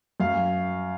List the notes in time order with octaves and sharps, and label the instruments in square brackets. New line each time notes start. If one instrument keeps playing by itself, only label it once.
[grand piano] F#2 F5